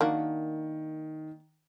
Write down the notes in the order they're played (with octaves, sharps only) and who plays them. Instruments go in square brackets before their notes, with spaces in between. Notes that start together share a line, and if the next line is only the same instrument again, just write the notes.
[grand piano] D#3 [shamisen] A#3 D4 F#4